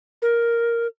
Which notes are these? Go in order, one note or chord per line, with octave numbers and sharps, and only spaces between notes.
A#4